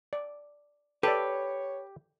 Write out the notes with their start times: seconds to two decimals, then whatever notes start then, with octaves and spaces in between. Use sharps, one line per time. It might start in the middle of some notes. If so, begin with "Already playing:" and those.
0.13 D5
1.03 G4 A4 B4 C#5 D5